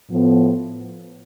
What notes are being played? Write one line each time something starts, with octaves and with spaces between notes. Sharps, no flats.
A2 F3 B3